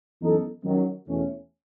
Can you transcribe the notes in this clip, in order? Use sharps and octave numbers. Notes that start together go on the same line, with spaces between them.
F#2 E3 B3 D#4 A4
F#2 D#3 F#3
E2 B2 A3 C#4